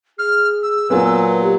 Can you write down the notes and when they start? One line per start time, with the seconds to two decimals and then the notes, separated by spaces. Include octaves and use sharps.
0.18 G#4 F6
0.62 E6
0.90 A#2 F#3 B3 G#5
1.41 G4